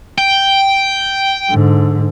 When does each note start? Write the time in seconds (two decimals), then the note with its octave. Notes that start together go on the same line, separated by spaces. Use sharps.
0.18 G5
1.51 G#2 D3